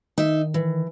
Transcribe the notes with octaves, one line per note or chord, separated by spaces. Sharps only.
D#3 D#4 E5
E3